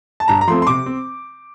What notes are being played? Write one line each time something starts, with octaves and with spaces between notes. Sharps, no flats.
A5
G2 A#5
A#5
F3 A3 C4 C6
C6
C3 D6
C4